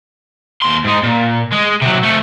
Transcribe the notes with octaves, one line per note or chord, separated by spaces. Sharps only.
D#2 C6
G#2 G#3
A#2
G#3
C3 F#3
F3 A3